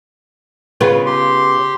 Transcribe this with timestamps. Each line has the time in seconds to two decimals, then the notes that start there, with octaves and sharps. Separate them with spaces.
0.81 C#3 B3 F4
1.06 G4 C6